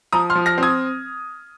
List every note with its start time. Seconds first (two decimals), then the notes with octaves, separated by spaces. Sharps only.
0.13 F3 A#5 D#6
0.30 C6 F6
0.35 F3
0.46 F6 A#6
0.58 C4
0.63 D#6 G#6